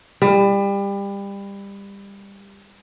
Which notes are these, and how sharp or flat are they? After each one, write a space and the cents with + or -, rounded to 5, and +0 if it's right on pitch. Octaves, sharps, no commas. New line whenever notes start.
G3 +25